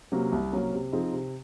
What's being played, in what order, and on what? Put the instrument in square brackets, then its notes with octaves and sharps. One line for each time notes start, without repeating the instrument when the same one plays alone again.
[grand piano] C3 F#3 A#3 C#4
C2
C3 F#3 A#3 C#4
C3
F3 C4 D#4 G#4
C3